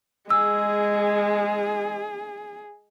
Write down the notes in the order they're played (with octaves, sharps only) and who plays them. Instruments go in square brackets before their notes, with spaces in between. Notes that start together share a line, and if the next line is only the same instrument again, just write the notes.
[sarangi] G#3 [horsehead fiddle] G#4 [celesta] E6